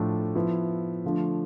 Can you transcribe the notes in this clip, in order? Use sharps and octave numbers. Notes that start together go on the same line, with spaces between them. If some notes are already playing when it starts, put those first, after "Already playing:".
Already playing: A2 F3 A3 D4
F3 B3 E4
D3 F3 A3 D4